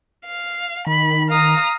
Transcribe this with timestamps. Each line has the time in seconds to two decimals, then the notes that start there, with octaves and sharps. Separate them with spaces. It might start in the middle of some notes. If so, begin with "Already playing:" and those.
0.25 F5
0.87 D#3 B5
1.29 F5 A#5 D#6